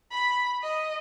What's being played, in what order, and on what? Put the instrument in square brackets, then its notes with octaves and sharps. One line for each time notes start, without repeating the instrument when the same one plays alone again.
[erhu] B5
D#5